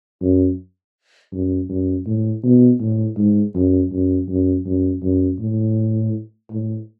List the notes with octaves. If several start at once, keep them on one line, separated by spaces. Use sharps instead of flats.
F#2
F#2
F#2
A2
B2
A2
G#2
F#2
F#2
F#2
F#2
F#2
A2
A2